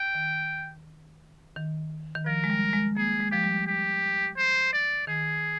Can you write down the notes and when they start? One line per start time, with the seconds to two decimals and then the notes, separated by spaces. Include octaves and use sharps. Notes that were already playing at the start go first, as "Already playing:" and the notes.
Already playing: G5
0.15 D#3
1.56 D#3
2.15 D#3
2.26 F3 A#4
2.44 G#3
2.50 G3
2.73 G#3
2.97 A#3 G#4
3.20 G#3
3.31 F3 G4
3.44 G3
3.67 G4
4.37 C5
4.73 D5
5.07 D#3 G#4